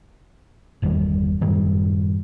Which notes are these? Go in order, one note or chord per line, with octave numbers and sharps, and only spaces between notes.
G1 E2 D#3 G3
F#2 A2 D#3 G3